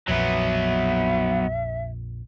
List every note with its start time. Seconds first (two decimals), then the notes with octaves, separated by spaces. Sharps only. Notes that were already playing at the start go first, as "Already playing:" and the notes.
0.08 A#1 F2 A#2 F#3 B3 E5